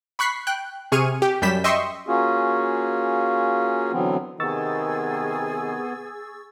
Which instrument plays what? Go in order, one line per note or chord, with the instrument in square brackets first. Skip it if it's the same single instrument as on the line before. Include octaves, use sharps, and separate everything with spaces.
[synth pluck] B5 C#6 F#6 B6 C7
G5 F#6
C3 G#4 C#6 F6 D#7
G4
F#2 G3 G6 B6 E7
D#5 E5 G5 C6 C#6
[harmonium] A#3 C#4 F4 F#4 G#4
D3 E3 F#3 B3 C4
[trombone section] C3 D#3 [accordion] B3 [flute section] G#4 [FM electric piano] C#6 E6 A6